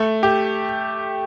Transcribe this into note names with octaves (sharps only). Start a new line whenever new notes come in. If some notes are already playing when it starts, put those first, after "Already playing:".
Already playing: A3
G4